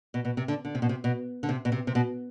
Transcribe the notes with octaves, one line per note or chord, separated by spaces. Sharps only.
B2
B2
C3
D3
D3
C3
B2
C3
B2
D3
C3
B2
C3
C3
B2